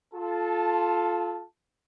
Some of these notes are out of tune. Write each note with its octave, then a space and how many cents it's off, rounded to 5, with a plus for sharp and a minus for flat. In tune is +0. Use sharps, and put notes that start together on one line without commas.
F4 +0 A4 -25 A5 +0